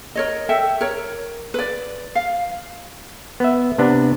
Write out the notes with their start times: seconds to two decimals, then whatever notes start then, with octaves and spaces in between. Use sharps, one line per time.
0.15 A#4 C#5 D#5
0.49 A4 E5 G5
0.81 A#4 C#5
1.54 B4 D5
2.15 F5
3.40 B3 E5
3.78 C3 B3 D4